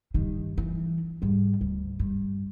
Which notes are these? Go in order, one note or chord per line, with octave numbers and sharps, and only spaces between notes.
G2 D#3
E3
G#2 G3
D2
G2